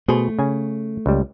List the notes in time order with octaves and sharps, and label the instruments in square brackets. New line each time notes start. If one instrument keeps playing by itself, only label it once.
[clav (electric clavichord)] B2 G#4 C5 [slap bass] A3
[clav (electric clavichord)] C#3 G#5
C#2 G3